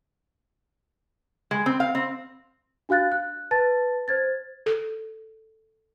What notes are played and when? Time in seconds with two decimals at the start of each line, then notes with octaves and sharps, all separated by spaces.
1.51 G#3
1.66 C4
1.80 F5
1.95 C4
2.89 D4 F#4 F5 F#6 A6
3.12 F#6
3.51 B4 A5 A6
4.08 C5 G#6 A6
4.66 A4